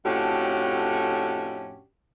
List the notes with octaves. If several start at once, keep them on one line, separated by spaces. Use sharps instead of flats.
F2 A2 C#4 D4 F#4 G4